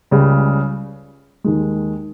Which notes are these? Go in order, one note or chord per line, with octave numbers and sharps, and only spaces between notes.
C#2 C#3 G3
D#2 D#3 G#3